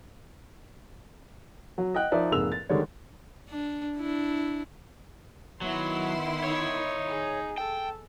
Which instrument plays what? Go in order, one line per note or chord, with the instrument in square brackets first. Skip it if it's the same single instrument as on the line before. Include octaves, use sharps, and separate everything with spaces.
[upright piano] F#3
D#5 F#5 G5 F#6
F3 D#4 A#4 D5 E5
F1 G#2 A#3 G#4 E6 F7
A6
D3 D#3 G3 G#3 C#5 D5
[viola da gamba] D4
D4 E4
[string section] D#3 E4 C6 [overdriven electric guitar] F#3 [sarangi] B3
[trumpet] D#4 [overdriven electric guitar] C#5
[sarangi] G#4
[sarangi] A4 [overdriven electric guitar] G5